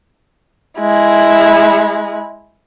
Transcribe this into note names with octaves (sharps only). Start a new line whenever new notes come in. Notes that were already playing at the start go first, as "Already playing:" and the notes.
G#3 E4